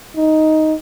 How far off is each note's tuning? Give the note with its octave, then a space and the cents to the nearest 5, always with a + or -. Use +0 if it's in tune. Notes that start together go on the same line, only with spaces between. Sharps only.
D#4 +5